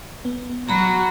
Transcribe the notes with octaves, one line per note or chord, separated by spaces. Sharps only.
B3
F#3 F#4 A#5 B5